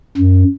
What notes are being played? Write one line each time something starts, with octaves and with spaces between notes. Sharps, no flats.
F#2